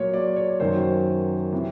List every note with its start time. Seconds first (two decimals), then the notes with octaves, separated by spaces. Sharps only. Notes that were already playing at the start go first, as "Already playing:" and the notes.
Already playing: A#2 F#3 C#5
0.14 D5
0.36 C#5
0.60 F#2 D#3 F#3 C5
1.53 C3 E3